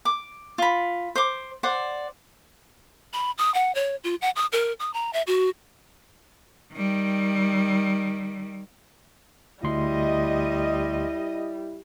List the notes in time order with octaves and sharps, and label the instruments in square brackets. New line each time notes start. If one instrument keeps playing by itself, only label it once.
[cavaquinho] D6
F4 B5
C5 D6
C5 D5 F#5
[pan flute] B5
D#6
F#5
C#5
F4
F#5
D#6
A#4
D#6
A#5
E5
F#4
[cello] D#3 G3
[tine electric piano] D2 C6 [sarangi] G3 [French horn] E4 [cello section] D#5